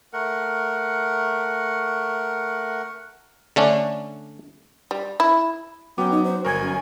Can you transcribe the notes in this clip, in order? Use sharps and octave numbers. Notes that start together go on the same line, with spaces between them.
A3 A#4 F#5
D3 A3 C#4 D4
G3
E4
F#3 B3 C#4 G5 D6
D#4
C5
G1 A#4 G#5 C#6 G#6
F#2